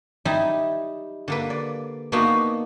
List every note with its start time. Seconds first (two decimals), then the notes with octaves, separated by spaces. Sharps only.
0.25 G3 D#4 E4
1.28 D3 A#3 B4
1.50 D5
2.12 A#3 B3 D4 D#4 F#4